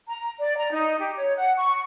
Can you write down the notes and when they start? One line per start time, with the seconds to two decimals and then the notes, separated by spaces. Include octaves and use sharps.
0.08 A#5
0.39 D5
0.57 A#5
0.71 D#4
0.98 G4
1.16 C#5
1.36 F#5
1.56 C#6